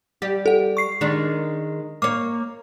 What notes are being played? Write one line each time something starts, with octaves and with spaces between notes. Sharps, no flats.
G3 G4
A4 F#5
C#6 C7
D#3 G#3 D4
A#3 C#5 D6